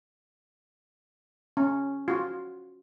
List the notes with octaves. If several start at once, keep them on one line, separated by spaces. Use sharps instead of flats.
C#4
F4 F#4